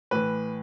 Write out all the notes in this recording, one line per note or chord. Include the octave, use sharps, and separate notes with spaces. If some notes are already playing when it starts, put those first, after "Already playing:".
A2 E3 B4